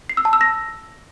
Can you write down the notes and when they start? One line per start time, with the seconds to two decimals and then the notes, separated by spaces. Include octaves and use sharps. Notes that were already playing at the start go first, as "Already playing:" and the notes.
0.09 C7
0.17 E6
0.25 A5
0.33 E6
0.41 A#6